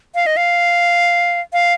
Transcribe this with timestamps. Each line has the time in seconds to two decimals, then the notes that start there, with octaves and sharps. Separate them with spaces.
0.15 F5
0.26 D#5
0.37 F5
1.53 F5